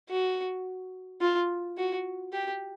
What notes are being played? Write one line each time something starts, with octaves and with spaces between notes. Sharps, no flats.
F#4
F4
F#4
G4